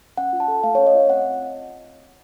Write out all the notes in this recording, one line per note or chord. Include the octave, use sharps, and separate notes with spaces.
C#4 F#5
F4
A5
A4
A3 F5
C#5
C#4
D#5
F4
C4 F#5